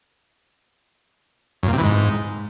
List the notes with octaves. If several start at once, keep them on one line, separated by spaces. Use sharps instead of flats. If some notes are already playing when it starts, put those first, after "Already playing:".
F#2
A#2
C3
E3
G#2